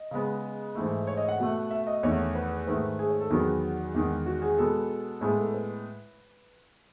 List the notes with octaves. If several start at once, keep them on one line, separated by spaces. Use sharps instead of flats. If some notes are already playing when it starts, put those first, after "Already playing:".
Already playing: D#5
C#3 G#3 B3
G#2 E3 A3
C#5
D#5
F#5
B2 A3
E5
D#5
E2 D#3 A3 C#5
B4
G#2 D#3 A3 B4
G#4
C#5
A4
E2 D#3 F#3 B3 G#4
E2 D#3 G#3
F#4
G#4
B2 G#3 B3 A4
A2 G#3 B3 G#4
A4
B4